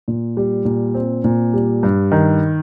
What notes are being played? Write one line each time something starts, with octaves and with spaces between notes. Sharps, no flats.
A#2
G3
A#2
C4
A#2
G3
G2
D#3